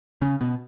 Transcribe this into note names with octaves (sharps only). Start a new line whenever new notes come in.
C#3 C#4
B2 B3